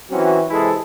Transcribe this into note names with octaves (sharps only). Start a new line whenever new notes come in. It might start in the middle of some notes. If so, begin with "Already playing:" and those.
E3 F#3 C4 C#4 F#4
C3 E3 G#3 E4 G#4 A4